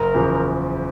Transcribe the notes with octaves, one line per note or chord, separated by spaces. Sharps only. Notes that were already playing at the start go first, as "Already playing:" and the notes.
Already playing: F#1 A#4
E2 C#3 F3